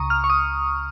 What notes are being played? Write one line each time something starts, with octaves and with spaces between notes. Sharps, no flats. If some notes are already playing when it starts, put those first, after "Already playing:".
Already playing: C#2 C#3 A#5 C#6 D#6
F6
C#6
D#6